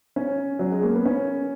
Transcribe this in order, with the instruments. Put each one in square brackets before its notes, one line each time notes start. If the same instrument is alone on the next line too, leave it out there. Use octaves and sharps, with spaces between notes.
[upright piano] C#4
F#3
G#3
A#3
B3
C#4